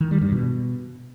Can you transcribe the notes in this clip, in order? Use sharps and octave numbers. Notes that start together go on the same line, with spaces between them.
D#3
G3
G2
B2